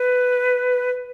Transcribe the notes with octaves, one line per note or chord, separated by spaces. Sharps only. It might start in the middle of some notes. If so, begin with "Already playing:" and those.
Already playing: B4